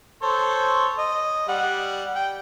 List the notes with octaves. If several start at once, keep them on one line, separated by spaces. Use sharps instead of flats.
A4 C5 C#5
D#5
G3 F#5
G5